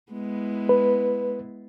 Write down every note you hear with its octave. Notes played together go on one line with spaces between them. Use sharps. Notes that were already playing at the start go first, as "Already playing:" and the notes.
G#3 B3 E4
B4